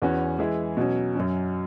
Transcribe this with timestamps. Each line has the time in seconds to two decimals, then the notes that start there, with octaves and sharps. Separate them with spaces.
0.02 E2 E3 C#4 F#4
0.39 E3 G#3 E4 G#4
0.77 B2 F#3 C#4
1.15 F#2 F#3 C#4